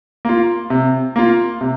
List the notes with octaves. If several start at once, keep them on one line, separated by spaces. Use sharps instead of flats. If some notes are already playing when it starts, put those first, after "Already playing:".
A#3 F4
C3
A#3 F4
C3